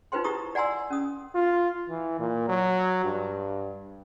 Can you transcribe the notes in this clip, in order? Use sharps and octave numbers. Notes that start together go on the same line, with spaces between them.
D#4 F4 B4 C5 G5 C6
E4 G4 A#5 C#6 D#6
D5 F#5 G#5 A#5 C6 E6
C#4 D#6
F4
E3
A#2
F#3
G2